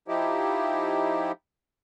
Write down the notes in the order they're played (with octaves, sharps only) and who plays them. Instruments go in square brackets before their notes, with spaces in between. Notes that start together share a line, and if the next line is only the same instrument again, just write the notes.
[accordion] F3 D#4 E4 G4